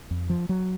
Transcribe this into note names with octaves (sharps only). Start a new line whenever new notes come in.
F2
F3
F#3